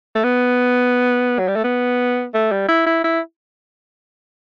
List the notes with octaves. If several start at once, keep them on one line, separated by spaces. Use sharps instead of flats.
A3
B3
F#3
G3
A3
B3
A3
G3
E4
E4
E4